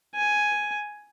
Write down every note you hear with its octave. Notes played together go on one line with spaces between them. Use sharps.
G#5